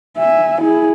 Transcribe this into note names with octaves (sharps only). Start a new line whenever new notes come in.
E5 G#5
E4 G#4